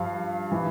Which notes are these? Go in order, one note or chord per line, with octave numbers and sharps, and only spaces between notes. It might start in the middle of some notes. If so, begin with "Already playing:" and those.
Already playing: G2 F3 F5
E3